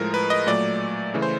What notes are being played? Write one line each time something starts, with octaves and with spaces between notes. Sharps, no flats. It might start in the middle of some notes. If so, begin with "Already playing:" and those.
Already playing: A2 F3 G#3 A#4
B4
D#5
A#2 F#3 A3 D5
C#3 E3 A3
C5